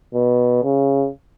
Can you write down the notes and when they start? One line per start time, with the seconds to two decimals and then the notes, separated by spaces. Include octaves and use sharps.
0.14 B2
0.63 C#3